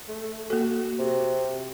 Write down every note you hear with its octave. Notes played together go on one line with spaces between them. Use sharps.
A3
A#3 F#4 A4
C3